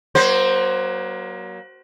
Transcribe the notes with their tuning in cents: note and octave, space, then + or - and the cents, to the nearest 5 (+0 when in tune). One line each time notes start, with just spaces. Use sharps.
F#3 +20 A#3 +40 C5 +0